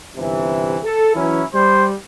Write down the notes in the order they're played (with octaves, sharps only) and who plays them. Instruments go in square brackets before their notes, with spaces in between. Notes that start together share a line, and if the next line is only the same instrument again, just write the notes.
[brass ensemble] G1 C3 E3
A4
[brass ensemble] E3 F#3 C#4 [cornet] E4
[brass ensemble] G3 [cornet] C5